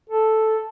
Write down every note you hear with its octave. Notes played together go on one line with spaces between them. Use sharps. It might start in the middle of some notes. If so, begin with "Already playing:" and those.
A4